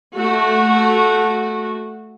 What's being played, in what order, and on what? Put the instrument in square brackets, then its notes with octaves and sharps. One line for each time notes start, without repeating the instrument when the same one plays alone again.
[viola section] A3 F#4